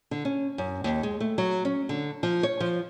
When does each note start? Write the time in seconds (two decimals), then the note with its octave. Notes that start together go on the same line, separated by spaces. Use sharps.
0.11 D3
0.25 C#4
0.58 F#2
0.84 D#2
1.03 G#3
1.20 A3
1.38 F#3
1.65 C#4
1.89 D3
2.23 F3
2.43 C#5
2.60 F3